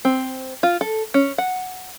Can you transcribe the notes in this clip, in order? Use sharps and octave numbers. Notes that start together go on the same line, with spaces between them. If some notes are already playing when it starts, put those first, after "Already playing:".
C4
F4
A4
C#4
F#5